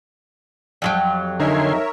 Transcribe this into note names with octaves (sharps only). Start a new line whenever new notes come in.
F2 F#3 G4
D3 D#4 A#4 C#5 E5 G#5 C6